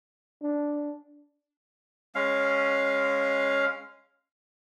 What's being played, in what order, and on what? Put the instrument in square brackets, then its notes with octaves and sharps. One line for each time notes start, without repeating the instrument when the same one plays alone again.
[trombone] D4
[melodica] G#3 C#4 F5